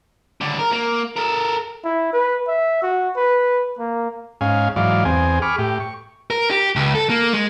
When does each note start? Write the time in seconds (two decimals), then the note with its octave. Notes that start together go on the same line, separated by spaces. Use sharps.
0.41 C#2 D3
0.59 A#4
0.72 A#3
1.17 A4 A#4
1.84 E4
2.13 B4
2.47 E5
2.82 F#4
3.17 B4
3.79 A#3
4.41 G#2 C#4 F5 G#5
4.76 G#2 E3 F#3 D5 F5
5.05 E2 C4 G#4 G#5
5.42 G#4 B5 C#6 D6 F6
5.58 A2 G4
5.80 C#6
6.31 A#4
6.51 G4
6.76 C#2
6.95 A4
7.10 A#3
7.33 G#3